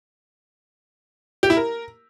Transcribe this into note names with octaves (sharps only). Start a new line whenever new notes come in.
G4
E4
A#4